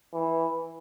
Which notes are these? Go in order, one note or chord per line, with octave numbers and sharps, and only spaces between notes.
E3